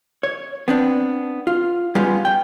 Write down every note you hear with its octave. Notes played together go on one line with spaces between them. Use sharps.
C#5
B3 C4 D4
F4
G3 G#3 B3 C#4 F4 G4
G5